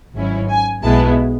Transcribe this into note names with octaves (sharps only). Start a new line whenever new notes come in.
G#1 G#2 F#3 C#4 E4
G#5
B1 B2 G#3 B3 E4 A5